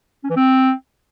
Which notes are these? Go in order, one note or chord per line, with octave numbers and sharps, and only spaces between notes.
C#4
E3
C4